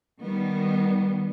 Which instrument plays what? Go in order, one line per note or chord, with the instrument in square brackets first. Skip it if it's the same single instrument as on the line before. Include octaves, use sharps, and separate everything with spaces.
[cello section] D#3 G3 B3